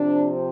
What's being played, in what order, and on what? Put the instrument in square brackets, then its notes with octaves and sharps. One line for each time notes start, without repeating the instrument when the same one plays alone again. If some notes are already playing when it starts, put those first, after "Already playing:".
Already playing: [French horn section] C3 F3 C4 D4